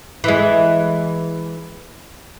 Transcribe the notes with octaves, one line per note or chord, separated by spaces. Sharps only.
E3 G#3